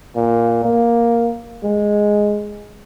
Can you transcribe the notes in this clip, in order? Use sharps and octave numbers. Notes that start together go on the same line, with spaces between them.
A#2
A#3
G#3